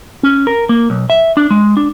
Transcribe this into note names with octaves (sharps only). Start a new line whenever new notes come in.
C#4
A#4
A#3
B1
E5
D4
G#3
D4